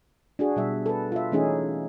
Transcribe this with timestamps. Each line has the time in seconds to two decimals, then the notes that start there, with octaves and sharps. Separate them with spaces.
0.39 D4 F#4 G#4
0.56 B2 G3 E5
0.86 A4 B4
1.12 F4 E5
1.32 E3 A3 C#4 D#4 G#4